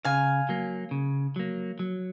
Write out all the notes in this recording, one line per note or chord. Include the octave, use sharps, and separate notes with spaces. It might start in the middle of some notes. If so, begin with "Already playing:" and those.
C#3 F5 G#5
F#3 A#3
C#3
F#3 A#3
F#3